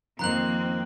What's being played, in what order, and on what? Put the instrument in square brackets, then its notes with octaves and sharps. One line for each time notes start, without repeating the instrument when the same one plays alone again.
[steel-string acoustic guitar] F2 D#3 F3 [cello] A#3 C4 [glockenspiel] A#5 F#6 F#7